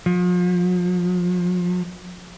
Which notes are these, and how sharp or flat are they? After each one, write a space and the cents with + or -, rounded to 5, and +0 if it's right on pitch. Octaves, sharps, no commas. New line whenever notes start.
F3 +40